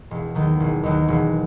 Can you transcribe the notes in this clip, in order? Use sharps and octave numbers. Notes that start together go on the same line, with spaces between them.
E1
D#2 D#3 F#3
E1
D#2 D#3 F#3
E1